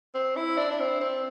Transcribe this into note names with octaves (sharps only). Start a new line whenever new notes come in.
C4
E4
D4
D4
C4
C4